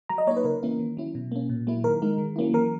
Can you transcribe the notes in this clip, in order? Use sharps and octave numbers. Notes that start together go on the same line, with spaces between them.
F#3 A#5
D#5
A#3 D#4 C#5
B4
C#3 A#4
E3 A#3 C#4 E4
D#3
F#3 C#4 E4
B2
A#3 C#4
A#2
F#3 A#3 E4
D#3 A#4
G#3 D#4
D#3
F#3 A#3 C#4 E4
E3 A#4